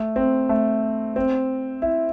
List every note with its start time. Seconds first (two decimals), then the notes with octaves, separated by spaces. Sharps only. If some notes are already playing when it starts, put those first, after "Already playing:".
Already playing: A3
0.16 C4
0.49 A3
1.16 C4
1.82 E4